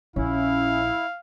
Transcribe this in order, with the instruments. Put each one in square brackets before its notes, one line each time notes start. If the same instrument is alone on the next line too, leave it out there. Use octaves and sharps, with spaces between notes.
[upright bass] A#1 [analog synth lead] C#4 [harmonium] E4 [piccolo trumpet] F5